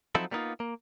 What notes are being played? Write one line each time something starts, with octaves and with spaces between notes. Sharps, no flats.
F3 F#3 C4 D#4 E4 A4
G3 A#3 B3 C#4 D#4 F4
A#3